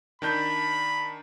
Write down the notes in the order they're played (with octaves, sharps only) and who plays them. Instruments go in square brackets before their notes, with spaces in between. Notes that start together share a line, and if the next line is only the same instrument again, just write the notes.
[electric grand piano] D#3 D4 G6 [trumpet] B5